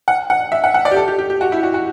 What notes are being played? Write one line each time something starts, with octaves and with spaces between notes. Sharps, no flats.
F#5
F#5
E5
F#5
F#5
D5
G4
A4
G4
G4
G4
F#4
E4
F#4
F#4